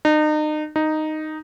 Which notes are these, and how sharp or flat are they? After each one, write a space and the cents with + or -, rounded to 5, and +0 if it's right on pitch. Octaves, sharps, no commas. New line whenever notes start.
D#4 -35
D#4 -5